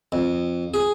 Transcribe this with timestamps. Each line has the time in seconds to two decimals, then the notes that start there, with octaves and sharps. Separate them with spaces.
0.12 F2
0.74 G#4